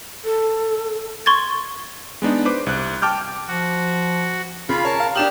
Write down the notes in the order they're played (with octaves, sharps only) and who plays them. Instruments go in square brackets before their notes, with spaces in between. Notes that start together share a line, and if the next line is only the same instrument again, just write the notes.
[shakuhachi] A4
[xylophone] C6 C#6 G#6 A6
[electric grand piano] G#3 B3 D4 D#4
B4 C5 D6
C2 F#6
G5 A5 D6 F6 G6
[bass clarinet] F3 [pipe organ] F#4
[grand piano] C#3 [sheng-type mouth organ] F4 F5 B5
[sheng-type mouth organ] A#4 A5 [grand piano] C#5
[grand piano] F5
[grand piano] D4 E7 F#7 [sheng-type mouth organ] G4 D#6 F6